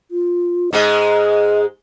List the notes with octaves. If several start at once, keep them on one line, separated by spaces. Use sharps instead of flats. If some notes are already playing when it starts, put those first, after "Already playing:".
F4
G#2 G#3 G#4 D#5